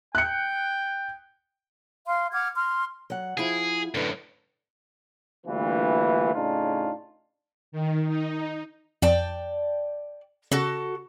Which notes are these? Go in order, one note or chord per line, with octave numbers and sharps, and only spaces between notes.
G5 F#6 C#7
F5 C6
F#5 D6 F6 G#6
C6 F6
F#3 F#5
F3 E4 G#4
F#2 A2 D3 B4
D2 G2 A#2 E3
A2 C#3 D4 D#4 F4
D#3
D#4
F2 D5 G5 A5
C#3 F#4 A4